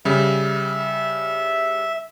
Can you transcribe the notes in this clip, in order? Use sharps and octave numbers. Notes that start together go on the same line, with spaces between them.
C#3 G3 E5